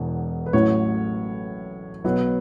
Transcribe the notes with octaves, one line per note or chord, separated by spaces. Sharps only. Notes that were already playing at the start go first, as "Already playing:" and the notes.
Already playing: E1 E2 B2
B4
A1 A2 F#3 C#5
B1 B2 F#3 B3